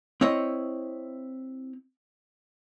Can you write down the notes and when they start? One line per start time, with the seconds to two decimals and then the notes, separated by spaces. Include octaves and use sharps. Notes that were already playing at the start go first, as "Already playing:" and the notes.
0.21 C4 E4 C#5 D#5